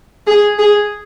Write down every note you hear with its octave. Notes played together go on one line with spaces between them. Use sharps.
G#4
G#4